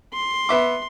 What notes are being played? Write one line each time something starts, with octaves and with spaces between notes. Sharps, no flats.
C6
B3 E5 D6